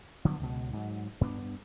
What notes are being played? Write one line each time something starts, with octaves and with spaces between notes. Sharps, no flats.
D3 F#3 G#3 B3
C#2 B2
G#2 F#3
G2 B3 C4 D4